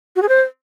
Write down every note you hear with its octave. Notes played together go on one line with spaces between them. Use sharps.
F#4
G#4
C5